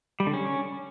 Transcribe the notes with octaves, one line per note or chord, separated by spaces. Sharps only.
G3
D3
C#4